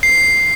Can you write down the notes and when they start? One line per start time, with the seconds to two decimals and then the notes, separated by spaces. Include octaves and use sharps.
0.03 C7